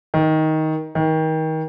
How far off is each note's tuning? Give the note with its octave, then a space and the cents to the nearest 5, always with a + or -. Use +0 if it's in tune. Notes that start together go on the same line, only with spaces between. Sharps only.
D#3 +15
D#3 +30